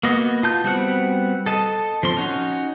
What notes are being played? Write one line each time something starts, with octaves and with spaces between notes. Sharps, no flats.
A#3 B3 F#4 D#5
F4 A5 G6
G3 B3 C4 F#4 F#5
A4 D#5 A5
F3 C4 C6
C#4 D#4 F#4